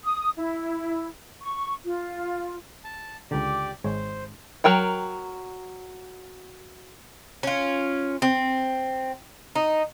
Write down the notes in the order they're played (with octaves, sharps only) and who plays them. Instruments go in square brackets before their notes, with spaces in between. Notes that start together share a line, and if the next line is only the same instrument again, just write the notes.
[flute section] D#6
E4
C#6
F4
[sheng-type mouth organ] A5
[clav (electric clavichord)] C#2 D3 [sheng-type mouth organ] G4 D5
[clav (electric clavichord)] G#1 G#3 C#5 [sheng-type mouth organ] C5
[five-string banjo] F#3 A#4 G5 A#5
[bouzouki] C#4 F4
C4
D#4